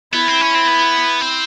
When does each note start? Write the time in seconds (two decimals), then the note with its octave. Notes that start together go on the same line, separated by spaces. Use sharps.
0.13 B3 E4
0.28 C4
0.41 C#4
0.55 C4
0.67 B3
1.21 C4